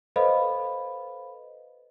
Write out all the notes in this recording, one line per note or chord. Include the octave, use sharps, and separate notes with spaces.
A4 B4 C5 D#5 F5 B5